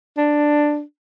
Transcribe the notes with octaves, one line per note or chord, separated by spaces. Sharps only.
D4